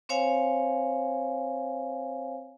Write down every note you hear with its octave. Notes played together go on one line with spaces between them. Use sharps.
C4 C5 C#5 F5 G#5